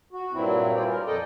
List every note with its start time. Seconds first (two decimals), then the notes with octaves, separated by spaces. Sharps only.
0.13 F#4
0.32 G2 A#2 F#3 C4 E4
0.75 F4 G#4 D5 G5
0.87 A#4
1.06 F2 A4 D5 D#5 G5